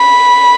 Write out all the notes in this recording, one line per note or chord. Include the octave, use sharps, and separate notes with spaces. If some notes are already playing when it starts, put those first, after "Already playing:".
Already playing: B5